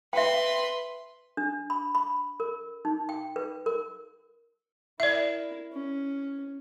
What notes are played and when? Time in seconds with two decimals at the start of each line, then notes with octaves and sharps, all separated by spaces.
0.13 B4 E5 G5 C6
1.37 D4
1.70 B5
1.95 B5
2.40 A#4
2.85 D#4
3.09 G5
3.36 B4
3.66 A#4
5.00 E4 A#4 D5 E5
5.73 C#4